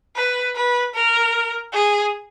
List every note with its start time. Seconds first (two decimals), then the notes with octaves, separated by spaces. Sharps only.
0.16 B4
0.56 B4
0.95 A#4
1.73 G#4